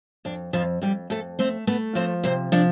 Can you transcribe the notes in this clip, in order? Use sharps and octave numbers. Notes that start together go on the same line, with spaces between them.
F2 D4
F2 F3 F4
F2 G3 G4
F2 A3 A4
A3 C4 C5
A3 B3 B4
F3 C4 C5
C3 C4 C5
F3 D4 D5